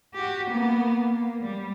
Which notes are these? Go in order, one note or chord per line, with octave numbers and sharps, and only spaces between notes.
F#4 G4
A#3 B3
A#3
G3